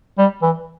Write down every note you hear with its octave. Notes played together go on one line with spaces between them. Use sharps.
G3
E3